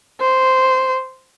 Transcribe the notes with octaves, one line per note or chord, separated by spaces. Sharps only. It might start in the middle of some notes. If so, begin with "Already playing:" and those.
C5